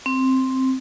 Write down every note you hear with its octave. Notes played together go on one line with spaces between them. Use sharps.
C4